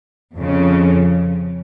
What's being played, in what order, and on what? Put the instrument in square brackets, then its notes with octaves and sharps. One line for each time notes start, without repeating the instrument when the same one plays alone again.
[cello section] F2 C#3